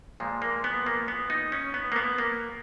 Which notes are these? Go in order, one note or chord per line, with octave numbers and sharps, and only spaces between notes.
A#2 F3 G#3
A#3
B3
A#3
B3
D#4
C#4
B3
A#3
B3
A#3